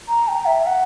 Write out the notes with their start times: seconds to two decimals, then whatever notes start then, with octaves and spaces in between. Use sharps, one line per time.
0.09 A#5
0.28 G5
0.46 E5
0.66 F#5